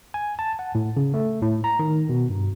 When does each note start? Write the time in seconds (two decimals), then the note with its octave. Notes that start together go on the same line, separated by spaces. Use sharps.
0.14 G#5
0.39 A5
0.59 F#5
0.75 A2
0.97 C#3
1.14 A3
1.42 A2
1.64 A#5
1.79 D#3
2.09 B2
2.29 G2